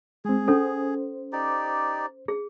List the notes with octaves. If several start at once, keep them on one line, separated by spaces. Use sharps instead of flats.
G#3 C4 G#4
C#4 A4 C5
D#4 G4 D5
G#4